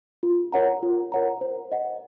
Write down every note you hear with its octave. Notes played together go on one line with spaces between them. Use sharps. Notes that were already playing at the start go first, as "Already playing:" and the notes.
F4
A#4 C#5 F#5 A#5
F4
A#4 C#5 F#5 A#5
C5
D#5 F#5